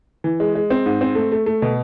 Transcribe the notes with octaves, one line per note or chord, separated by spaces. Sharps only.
E3
G#3
G#3
C4
G#2
C4
A3
A3
A3
B2